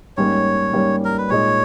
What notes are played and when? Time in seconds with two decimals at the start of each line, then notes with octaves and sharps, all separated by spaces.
0.17 G#2 G3 A#3 C#4 C#5
0.73 G#2 G3 A#3 C#4
1.05 A#4
1.18 B4
1.30 A#2 G#3 D#4 C#5